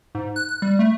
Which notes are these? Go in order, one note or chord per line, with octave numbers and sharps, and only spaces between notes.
G#2
F#6
F#6
G3
A3